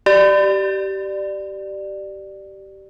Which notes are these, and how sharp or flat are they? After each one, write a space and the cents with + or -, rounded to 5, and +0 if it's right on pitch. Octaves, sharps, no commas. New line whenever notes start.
G4 -20 D5 +15